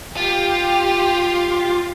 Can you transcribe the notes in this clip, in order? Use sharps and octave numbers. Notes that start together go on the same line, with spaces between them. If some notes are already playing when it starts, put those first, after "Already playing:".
F4 G4